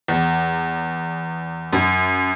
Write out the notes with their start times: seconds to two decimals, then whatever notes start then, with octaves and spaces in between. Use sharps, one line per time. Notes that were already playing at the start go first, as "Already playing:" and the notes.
0.08 E2
1.73 F#2